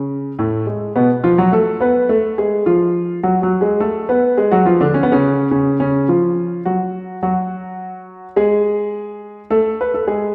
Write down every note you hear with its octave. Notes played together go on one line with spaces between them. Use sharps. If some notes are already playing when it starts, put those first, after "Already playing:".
Already playing: C#3 C#4
A2 A3
G#3
B2 B3
F3 F4
F#3 F#4
A3 A4
B3 B4
A3 A4
G#3 G#4
F3 F4
F#3 F#4
F#3 F#4
G#3 G#4
A3 A4
B3 B4
G#3 G#4
F#3 F#4
F3 F4
D3 D4
C#4
B3
C#3 C#4
C#3 C#4
C#3 C#4
F3 F4
F#3 F#4
F#3 F#4
G#3 G#4
A3 A4
B4
A4
G#3 G#4